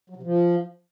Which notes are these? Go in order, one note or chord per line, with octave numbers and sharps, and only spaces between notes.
F#3
C3
F3